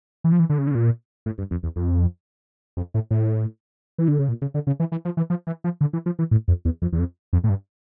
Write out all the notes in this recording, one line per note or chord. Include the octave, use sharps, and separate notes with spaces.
E3
F3
E3
D3
C#3
D3
C#3
A#2
A2
G2
F2
E2
F2
F2
A2
A2
E3
D3
C#3
A#2
C#3
D3
C#3
E3
E3
F3
E3
F3
E3
F3
D3
E3
F3
E3
A2
F2
E2
F2
E2
F2
F2
A2
G2